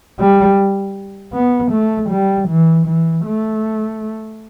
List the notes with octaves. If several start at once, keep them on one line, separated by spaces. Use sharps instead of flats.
G3
B3
A3
G3
E3
E3
A3